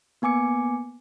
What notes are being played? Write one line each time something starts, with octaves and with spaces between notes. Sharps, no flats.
A#3 B3 G#5 D6 C#7